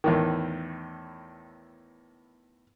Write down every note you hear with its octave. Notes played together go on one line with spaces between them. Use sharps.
E2 A2 D#3